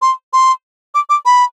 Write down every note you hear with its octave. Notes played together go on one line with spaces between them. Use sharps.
C6
C6
D6
D6
B5